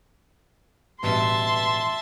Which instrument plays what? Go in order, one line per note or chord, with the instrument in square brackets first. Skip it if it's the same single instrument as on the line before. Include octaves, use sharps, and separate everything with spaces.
[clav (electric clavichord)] A1 G2 B2 [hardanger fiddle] E5 A5 [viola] C6